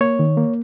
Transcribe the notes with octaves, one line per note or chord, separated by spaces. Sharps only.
A#3 C#5
D#3
A#3